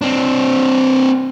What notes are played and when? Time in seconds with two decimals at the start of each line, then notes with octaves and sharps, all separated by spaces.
0.02 C4 D4